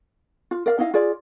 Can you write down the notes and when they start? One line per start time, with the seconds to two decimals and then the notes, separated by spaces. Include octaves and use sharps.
0.51 F4
0.66 A#4 D5 F5
0.78 D#4 E4 D#5 F5
0.94 F4 G#4 D5